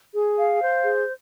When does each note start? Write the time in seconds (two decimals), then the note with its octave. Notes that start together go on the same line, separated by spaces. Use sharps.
0.13 G#4
0.37 F5
0.61 C5
0.84 G#4